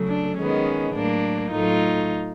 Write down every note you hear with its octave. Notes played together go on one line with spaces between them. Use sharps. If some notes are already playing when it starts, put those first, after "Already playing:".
Already playing: C#3 F#3 A3
D4
D#3 G#3 B3 C#4
A2 F#3 A#3 D4
A2 F#3 A3 D#4 F4